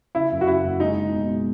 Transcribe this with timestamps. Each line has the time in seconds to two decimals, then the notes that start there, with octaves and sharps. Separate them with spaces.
0.15 C#3 E4
0.31 F#2
0.41 F#4
0.47 F#2 E4
0.64 F#1
0.80 G#3 D#4
0.97 G#3
1.13 B2
1.29 G#3